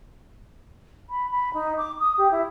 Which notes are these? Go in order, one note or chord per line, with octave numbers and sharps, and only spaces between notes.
B5
B5
D#4
D6
D#6
G4
E4